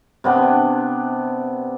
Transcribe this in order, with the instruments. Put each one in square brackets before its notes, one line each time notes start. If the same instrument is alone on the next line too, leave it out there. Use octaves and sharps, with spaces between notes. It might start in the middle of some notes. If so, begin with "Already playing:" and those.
[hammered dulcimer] C3 B3 D4